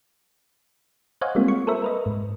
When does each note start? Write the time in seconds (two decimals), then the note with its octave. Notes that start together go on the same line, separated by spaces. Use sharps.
1.21 C5 C#5 D#5 F5 F#5 G#5
1.35 G3 G#3 A#3 C4 F4
1.48 C#6
1.67 A4 A#4 C5 E5
1.82 A#4 B4 D#5
2.06 G#2